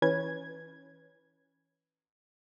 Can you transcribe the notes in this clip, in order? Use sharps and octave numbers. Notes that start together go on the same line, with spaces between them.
E3 C#4 B4 G#6